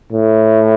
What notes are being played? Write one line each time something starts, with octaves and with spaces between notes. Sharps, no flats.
A2